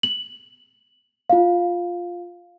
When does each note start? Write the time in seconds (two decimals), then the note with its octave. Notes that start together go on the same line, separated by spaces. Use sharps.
0.03 F#7
1.30 F4 F5